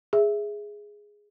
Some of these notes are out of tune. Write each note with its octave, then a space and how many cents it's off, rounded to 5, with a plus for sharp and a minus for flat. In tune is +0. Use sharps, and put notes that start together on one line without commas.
G#4 +0 E5 +0